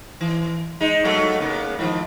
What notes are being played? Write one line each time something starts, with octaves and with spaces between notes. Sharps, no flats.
E3
G#3 D#4
G2 F#3 A3
C#3 A#3 B3
G#2 D#3 F3